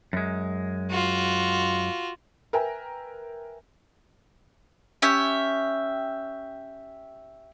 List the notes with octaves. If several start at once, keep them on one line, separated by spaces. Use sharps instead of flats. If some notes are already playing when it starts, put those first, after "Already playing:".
F#2 G#3
F4 F#4
A#4 B4 E5 G5 G#5 A#5
C#4 G4 E5